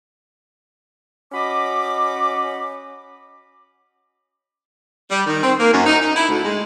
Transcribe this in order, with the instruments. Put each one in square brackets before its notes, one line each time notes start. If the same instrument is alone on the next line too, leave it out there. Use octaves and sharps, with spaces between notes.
[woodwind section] C#4 F#4 D#5 B5 D6
[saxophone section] G3
D#3
C4
A#3
F#2
D#4
D#4
E4
D2
G#3